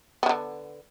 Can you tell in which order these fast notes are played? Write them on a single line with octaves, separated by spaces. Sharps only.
B3 D#3 D3